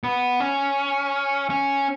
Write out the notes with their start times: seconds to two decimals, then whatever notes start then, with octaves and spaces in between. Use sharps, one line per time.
0.04 B3
0.40 C#4
1.50 C#4